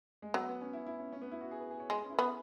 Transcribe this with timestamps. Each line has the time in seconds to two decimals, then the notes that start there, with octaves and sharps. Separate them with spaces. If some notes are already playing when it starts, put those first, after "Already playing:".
0.22 G#3
0.34 F#3 B3
0.48 B3
0.61 C#4
0.73 E4
0.86 E4
1.00 C#4
1.12 C#4
1.22 B3
1.32 E4
1.41 F#4
1.51 G#4
1.60 B4
1.71 G#4
1.80 C#5
1.90 G#3 B4
1.99 G#4
2.04 C#4
2.10 E4
2.14 B4
2.19 B3 G#4